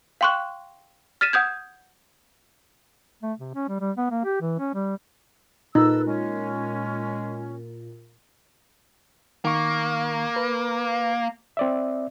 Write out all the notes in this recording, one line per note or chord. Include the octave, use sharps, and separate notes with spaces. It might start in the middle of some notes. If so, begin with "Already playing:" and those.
F5 G5 C6 C#6 F#6
F6 A6 B6 D#7 E7
F#5 D#6 G6 G#6
A3
C3
C#4
G3
G3
B3
A#3
G4
E3
C#4
G3
A#2 D#4 A4 B4 E6
G#3 C#4
D#3 A#3 C#6
B4
C4 D5 E5